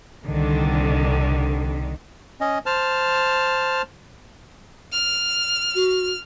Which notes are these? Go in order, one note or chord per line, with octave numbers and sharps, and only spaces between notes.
C2 D3 D#3
C#4 D#5
C5 A5 F6
F6
F#4